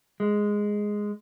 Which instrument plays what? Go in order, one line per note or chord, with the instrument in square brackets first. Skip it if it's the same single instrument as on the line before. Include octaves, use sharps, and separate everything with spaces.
[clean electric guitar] G#3